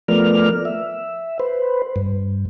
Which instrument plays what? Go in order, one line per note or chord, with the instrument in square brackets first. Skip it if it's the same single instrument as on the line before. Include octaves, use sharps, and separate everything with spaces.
[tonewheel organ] F3 A3 B3 A#4 D5 F6
E5
B4 C5
G2